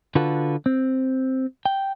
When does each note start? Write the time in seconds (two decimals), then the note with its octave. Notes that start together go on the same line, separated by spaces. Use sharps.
0.15 D3 F4 F#4 A4 B4
0.66 C4
1.65 G5